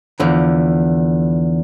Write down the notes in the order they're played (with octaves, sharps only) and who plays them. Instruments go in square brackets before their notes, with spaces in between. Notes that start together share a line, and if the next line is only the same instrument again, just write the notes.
[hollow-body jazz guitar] E2 D3 F3